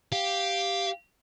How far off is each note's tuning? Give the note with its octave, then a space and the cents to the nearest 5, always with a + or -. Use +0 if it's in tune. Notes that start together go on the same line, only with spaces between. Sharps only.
G4 +0 F5 +0